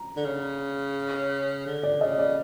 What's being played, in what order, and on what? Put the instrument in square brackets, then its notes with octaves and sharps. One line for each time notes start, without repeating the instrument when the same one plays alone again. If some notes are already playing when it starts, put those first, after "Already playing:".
Already playing: [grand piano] A#5
[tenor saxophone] D3
C#3
D3
[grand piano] D5
[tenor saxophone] C#3 [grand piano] D#5
[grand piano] D5